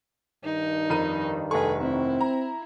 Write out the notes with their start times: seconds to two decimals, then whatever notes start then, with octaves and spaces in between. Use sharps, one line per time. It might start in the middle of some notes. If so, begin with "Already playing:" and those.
0.44 G2 D#3 D#4
0.90 F2 A#4 D#7
1.51 F1 G#4 A4 B4 C#6
1.82 C4 E4
2.21 A#5